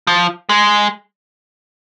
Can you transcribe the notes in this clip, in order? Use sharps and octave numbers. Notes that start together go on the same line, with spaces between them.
F3
G#3